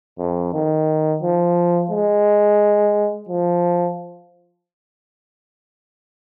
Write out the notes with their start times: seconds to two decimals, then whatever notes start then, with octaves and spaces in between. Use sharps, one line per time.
0.19 F2
0.54 D#3
1.23 F3
1.91 G#3
3.29 F3